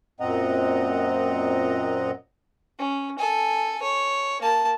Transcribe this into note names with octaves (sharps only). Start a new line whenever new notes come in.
F#2 A#2 C4 D#5 F#5 A#5
C#4
A4 G#5
C#5
A#3 A5